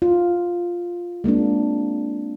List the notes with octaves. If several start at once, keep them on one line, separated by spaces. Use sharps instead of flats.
F4
G#3 A#3 C4 D4